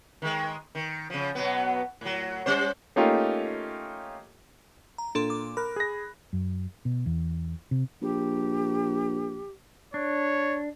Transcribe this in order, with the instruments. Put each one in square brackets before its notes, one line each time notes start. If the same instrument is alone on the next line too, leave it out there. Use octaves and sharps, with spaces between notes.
[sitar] D#3 G#3
D#3
C#3 F3
B2 F#3 B3
A2 F#3
G3 C#4 C5
[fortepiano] A3 A#3 C#4 D#4 F4 G4
[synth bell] A#5
[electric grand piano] A#2 [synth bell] D4 A4 C6
[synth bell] D6
[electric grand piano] A#4 [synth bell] B5 F#6
[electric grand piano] G#4 A#6
[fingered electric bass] F#2
B2
E2
C3
[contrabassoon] A#1 [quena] G4
[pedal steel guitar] D4 [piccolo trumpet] C#5